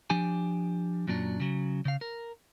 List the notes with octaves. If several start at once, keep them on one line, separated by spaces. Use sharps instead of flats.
F3 D4 G4 G#5
F#2 A#2 F#3 D4
C#3 F#3
C#3 F5
A#4